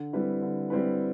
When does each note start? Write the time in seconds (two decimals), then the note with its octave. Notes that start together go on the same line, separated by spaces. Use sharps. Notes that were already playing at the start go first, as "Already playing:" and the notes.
Already playing: D3
0.13 G3 C4 E4 B4
0.42 D3
0.70 G3 C4 E4 B4